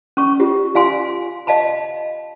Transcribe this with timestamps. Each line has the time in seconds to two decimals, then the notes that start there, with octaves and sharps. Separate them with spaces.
0.17 C#4 C#6
0.40 F4 G4
0.75 F4 F5 G#5 C6
1.47 D#5 F5 A5 B5